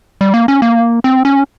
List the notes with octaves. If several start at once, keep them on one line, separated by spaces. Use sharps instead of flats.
G3
A#3
C#4
A#3
C4
C#4